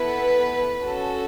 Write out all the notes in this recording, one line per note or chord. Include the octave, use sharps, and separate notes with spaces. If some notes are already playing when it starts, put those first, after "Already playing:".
Already playing: B3 E4 A4 B4
C#4 F#4 A4